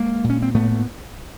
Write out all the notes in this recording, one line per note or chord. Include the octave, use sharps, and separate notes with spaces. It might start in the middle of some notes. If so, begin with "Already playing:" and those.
Already playing: G#3 A#3
A#2
C#4
C4
A2 A3 B3